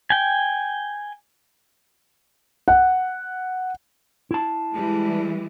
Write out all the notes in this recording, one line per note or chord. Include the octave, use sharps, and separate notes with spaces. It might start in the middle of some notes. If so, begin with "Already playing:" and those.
G5 G#5
F#5
E4 A5
E3 G3 G#3